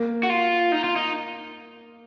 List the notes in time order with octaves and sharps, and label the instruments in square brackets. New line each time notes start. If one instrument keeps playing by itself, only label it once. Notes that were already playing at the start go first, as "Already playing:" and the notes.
Already playing: [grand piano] A#3
[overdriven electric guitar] F#4
F4
D#4
F4
D#4